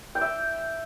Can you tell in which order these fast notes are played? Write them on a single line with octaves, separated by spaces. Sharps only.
G5 D6 E5